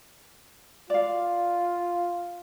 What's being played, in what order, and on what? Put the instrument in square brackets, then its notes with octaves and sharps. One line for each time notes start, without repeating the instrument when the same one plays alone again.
[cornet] F4 [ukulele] D5 F5